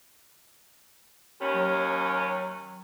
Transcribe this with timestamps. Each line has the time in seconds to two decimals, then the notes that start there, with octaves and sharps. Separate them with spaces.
1.41 D#2 C#4 B5
1.54 F#3